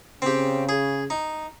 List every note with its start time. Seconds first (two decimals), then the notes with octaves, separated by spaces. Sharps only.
0.22 C#3 C4 G4
0.69 G#4
1.10 D#4